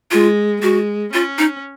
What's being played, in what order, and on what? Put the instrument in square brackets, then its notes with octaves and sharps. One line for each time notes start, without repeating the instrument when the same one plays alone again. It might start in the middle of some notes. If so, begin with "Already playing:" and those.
[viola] G#3 [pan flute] F4
[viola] G#3 [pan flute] F#4
[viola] C#4 [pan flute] F4
[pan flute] D#4